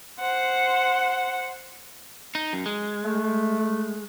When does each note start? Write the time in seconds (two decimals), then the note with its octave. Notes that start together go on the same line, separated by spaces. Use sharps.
0.20 C5 F#5
2.35 D#4
2.53 F#2
2.66 G#3
3.04 A3